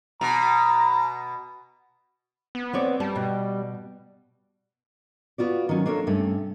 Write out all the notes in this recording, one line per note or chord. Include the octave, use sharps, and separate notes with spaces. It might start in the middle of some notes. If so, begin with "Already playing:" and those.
B2 A#5
B3
C4 C#5 D5
G3 A5
B2
B3 F4 F#4 D5
D#3 F#3 C#4
A#3 D4 A4 C#5 F5
G2 C3 A3 C#4